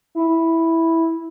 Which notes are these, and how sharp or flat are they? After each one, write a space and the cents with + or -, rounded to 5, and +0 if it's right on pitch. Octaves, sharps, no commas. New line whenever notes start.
E4 -5